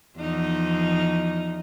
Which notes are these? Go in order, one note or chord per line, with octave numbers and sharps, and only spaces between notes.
E2 F3 D#4